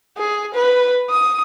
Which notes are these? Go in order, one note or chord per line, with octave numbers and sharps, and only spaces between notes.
G#4
B4
D#6